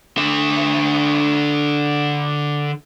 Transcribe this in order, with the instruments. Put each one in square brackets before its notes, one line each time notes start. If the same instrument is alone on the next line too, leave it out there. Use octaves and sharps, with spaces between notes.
[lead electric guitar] D3 E5